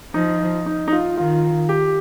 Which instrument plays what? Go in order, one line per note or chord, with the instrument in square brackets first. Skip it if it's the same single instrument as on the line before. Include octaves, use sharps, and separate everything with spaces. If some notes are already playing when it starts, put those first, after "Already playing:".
[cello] F3 [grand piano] D#4
[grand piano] D#4
D#4
F4
[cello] D#3 [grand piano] F4
[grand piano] G4